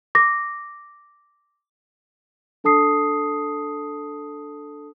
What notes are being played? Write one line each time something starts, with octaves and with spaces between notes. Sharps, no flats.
D6 A#6
D4 A4 A5 D#6 C7